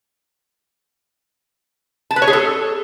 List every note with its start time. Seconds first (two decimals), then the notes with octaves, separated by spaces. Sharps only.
2.11 A5
2.16 B4
2.22 C#5
2.27 G#4
2.33 A4